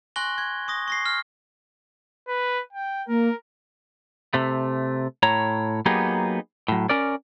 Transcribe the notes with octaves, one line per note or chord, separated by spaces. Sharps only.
G#5 C6 C#6 F#6 A#6 G7
G#6
C#6 D#6 A#6
C#6 A#6 C7
F6
B4
G5
A#3 A#4
C3 A3
A2 C#5 A#5
F#3 A#3 B3 D#4 G4 G#4
A2 F#3
C#4 A#4 D5